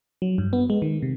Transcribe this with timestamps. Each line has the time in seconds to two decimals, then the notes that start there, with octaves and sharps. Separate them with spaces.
0.22 F#3
0.38 G2
0.53 B3
0.70 G#3
0.82 D#3
1.03 C3